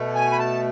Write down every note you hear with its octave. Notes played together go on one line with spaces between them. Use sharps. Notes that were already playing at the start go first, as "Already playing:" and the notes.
Already playing: B2 A3
G#5
B5
A5